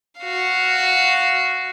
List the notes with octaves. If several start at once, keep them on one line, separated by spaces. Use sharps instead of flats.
F#4 F5